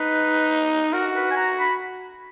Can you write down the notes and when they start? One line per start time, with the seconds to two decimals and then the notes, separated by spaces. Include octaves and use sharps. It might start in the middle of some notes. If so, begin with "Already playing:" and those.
Already playing: D#4 B4
0.93 F#4 A#4
1.16 B4
1.31 G#5
1.37 A#5
1.59 B5